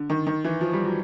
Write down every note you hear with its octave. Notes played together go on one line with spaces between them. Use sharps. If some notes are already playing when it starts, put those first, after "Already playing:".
Already playing: D3
D#3
D#3
E3
F3
G3
F#3